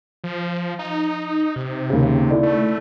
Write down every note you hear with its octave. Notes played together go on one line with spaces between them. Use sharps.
F3
D#4
C3
D#2 C#3
E4 A4 D5
A3